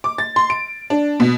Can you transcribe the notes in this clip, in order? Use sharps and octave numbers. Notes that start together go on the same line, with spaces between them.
D6
A6
C6
D7
D4
B2